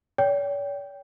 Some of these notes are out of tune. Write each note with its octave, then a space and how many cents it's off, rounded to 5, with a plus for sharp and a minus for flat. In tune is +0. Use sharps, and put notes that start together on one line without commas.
C#5 +45 G5 +0